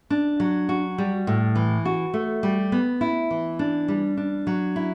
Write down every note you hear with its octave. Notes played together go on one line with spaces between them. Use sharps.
D4
F#3
F#4
G3
A2
E3
F#4
A3
G3
B3
E4
E3
D4
G3
D4
F#3
E4